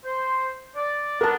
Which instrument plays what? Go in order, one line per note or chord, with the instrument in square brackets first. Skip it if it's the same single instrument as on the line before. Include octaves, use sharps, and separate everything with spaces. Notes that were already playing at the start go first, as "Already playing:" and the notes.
[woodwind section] C5
D5
[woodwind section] B3 D4 [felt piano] A#4 A5